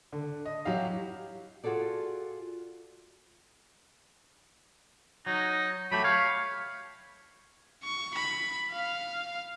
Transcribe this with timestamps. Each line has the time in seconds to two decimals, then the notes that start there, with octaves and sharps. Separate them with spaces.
0.13 D3
0.45 D#5
0.65 F#3 E4 G4 F5
1.64 F4 F#4 G#4 A4 D5
5.26 F#3 D#4
5.92 F#3 A3 G4 B5
6.04 C#5 F5
7.83 C#6
8.15 B5
8.72 F5